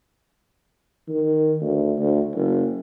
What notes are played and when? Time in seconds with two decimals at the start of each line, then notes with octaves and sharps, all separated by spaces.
1.09 D#3
1.61 D2
1.98 D2
2.35 F#1